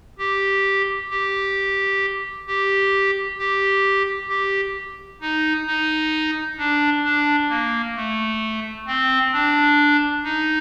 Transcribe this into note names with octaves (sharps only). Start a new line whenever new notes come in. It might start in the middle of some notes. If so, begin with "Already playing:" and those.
G4
G4
G4
G4
G4
D#4
D#4
D4
D4
A#3
A3
C4
D4
D#4